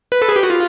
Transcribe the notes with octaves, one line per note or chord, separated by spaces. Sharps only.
B4
A4
G#4
G4
F#4
F4